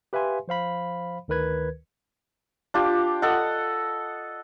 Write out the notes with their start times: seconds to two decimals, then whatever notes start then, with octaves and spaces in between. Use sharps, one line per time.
0.13 G4 B4 E5 F5 G#5 C6
0.48 F3 C5 F5 B5
1.28 D2 D#3 A#4 B4 G#6
2.74 D4 F4 G4
3.22 A4 D#5 F#5